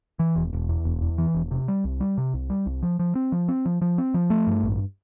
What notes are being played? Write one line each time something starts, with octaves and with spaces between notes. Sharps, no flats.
E3
E1
E1
E2
E1
E2
E3
E1
C3
G3
C2
G3
C3
C2
G3
C2
F3
F3
C4
F3
C4
F3
F3
C4
F3
A3
G2
A1